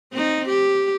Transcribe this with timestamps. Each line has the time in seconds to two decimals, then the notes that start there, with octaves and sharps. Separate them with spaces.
0.12 C4 D#4
0.49 G4